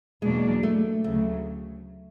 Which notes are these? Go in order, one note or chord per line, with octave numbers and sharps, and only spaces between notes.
E2 B2 F#3 G#3 A#3 D4
A3
D2 C#3 F#3 A3